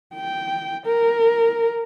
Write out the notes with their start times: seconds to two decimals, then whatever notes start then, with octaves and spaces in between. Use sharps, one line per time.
0.14 G5
0.86 A#4